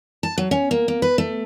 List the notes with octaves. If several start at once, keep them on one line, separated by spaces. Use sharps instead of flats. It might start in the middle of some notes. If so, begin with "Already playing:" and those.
A5
F#3
C#4
A#3
A#3
B4
A3